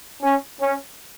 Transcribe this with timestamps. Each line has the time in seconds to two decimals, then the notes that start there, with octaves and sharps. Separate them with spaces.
0.23 C#4
0.60 C#4